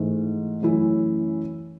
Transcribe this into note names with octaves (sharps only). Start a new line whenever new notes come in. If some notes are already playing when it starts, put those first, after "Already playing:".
Already playing: G#2 E3 A3
F#2 E3 A3 C#4 E4